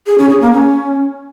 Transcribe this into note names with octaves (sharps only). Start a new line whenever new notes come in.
G#4
C#4
G#4
A#3
C#4